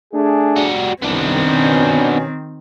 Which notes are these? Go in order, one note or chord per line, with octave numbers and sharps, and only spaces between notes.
A3 D4 G#4
G3 F#4
C2 D#3 B3 C4 D4
B2 C#4